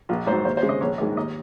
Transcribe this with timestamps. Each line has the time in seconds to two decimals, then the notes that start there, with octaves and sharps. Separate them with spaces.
0.09 A#1 F4
0.27 G#2 C5
0.32 F#3
0.45 D#2 C5
0.57 C5
0.62 C#3 G#3
0.69 D#5
0.81 A#1 C#5
0.98 G#2 D#3 G#3 D#5
1.16 D#2 D#5